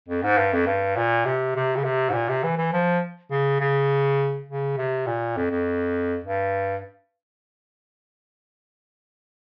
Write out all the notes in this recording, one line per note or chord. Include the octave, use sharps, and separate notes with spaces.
F2
G#2
G2
F2
G2
A#2
C3
C3
C#3
C3
G#2
A#2
C3
E3
E3
F3
C#3
C#3
C#3
C3
A#2
F2
F2
G2